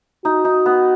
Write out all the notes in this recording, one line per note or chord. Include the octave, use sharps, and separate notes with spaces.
D#4 F#4
D#4
B3